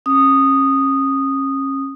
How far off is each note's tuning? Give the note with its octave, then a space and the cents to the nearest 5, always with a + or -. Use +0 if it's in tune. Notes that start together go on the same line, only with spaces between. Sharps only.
C#4 -30 D#6 -10